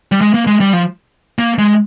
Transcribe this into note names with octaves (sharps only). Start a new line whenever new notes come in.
G3
G#3
A#3
G#3
G3
F3
A#3
G#3